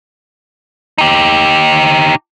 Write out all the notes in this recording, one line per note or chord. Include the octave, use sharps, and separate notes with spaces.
D#4 G4